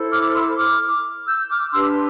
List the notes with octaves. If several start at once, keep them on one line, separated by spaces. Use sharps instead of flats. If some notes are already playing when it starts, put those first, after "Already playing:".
Already playing: E4 A4 C5
D6 F6
C6 E6
D6 F6
E6 G6
D6 F6
D4 G4 B4 C6 E6